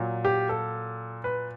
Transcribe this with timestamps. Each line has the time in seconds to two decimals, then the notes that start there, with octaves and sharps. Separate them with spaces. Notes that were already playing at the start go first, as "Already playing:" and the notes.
Already playing: A#2 F#3
0.25 G4
0.49 A4
1.24 B4